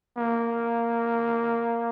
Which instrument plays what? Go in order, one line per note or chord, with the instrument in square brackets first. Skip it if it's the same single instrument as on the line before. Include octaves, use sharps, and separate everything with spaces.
[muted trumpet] A#3